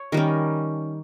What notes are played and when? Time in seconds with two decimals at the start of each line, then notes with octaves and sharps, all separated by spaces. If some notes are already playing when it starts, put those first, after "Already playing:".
Already playing: C#5
0.12 D#3 G3 C#4 A#4